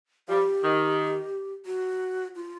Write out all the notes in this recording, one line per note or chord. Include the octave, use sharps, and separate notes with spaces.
F3 G3 G4
D#3
F#4
F4